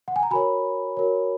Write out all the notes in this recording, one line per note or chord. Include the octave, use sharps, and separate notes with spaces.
F#5
G#5
A#5
F#4 A#4 C#5 G#5 B5
F#4 A#4 C#5